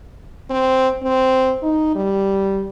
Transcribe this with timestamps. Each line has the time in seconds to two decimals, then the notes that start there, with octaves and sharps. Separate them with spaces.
0.50 C4
1.03 C4
1.62 D#4
1.95 G3